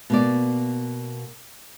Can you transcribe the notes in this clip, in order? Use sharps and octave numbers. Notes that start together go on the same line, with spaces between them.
B2 A#3 D5